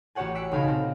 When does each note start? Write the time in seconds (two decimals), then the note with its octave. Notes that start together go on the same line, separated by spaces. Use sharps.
0.15 A1 F#4 G4 C#5 F#5 G#5
0.35 E6 F#6 B6 C#7 D7
0.51 B1 C#3 D#4 F5 G#5 B5
0.65 A#2 C4